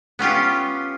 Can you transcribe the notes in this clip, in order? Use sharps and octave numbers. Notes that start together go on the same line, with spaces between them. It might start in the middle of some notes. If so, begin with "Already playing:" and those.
B3 C#4 F4 G4